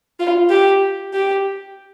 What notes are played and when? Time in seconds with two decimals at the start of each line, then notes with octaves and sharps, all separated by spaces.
0.20 F4
0.50 G4
1.14 G4